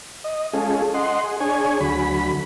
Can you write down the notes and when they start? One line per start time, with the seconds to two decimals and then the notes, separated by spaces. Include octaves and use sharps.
0.24 D#5
0.54 G#3 C#4 F4 G#4 A4
0.94 D#5 F#5 C6
1.24 G#4
1.40 D4 G#4 C#5 G#5
1.81 D2 F#3 B5